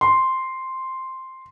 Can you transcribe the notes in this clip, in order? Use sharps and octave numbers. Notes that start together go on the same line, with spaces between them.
C6